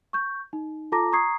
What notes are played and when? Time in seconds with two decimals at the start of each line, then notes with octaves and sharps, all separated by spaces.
0.13 C#6 G6
0.53 D#4
0.92 F4 A4 A5 A#5 D6 A#6
1.12 A#5 C#6 D#6 G#6 C7